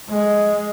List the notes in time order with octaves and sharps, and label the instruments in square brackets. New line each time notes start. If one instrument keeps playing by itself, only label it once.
[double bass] G#3